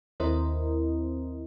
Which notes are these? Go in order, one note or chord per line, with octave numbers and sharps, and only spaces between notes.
D#2 C4 E4 A#4 C5 D#5